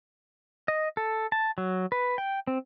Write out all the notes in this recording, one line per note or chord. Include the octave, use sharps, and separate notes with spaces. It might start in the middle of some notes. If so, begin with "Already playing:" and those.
D#5
A4
A5
F#3
B4
G5
C4